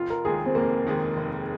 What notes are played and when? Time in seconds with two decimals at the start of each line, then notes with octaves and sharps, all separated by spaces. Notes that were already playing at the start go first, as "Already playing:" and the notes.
Already playing: F1 F4
0.10 A#4
0.25 D#2 D#3 G#3 G#4
0.46 C4
0.55 F1 A#3
0.86 D#2 D#3 G#3
1.17 F1